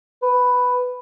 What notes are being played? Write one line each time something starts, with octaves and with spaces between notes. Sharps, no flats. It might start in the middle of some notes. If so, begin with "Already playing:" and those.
B4